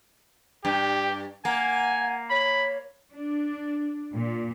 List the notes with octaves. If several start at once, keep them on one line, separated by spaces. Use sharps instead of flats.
G2 G4
A#3 F#5 G#5
C#5 B5
D4
A#2